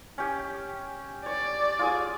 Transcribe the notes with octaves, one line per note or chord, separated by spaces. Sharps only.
C#4 G4
C#5 D5
F4 G#4 G#5